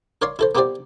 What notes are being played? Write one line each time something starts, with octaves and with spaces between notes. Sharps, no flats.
A#4 C#5 D5 F5 C6
E4 A4 C5
A#3 B3 E4 G4 C5 D5